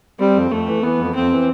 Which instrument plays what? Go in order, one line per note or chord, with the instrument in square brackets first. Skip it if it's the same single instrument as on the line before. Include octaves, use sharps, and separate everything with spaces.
[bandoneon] G3 [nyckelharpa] C4
[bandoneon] F2
[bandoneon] F2 [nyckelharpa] A3
[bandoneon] E3
[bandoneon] E3 [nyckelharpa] B3
[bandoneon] F2
[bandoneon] F2 [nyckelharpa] C4
[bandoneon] E3